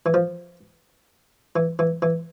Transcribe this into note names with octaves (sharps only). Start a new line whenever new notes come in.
E3
F3
E3
E3
E3